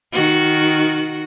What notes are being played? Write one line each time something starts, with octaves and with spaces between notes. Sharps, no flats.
D#3 F#4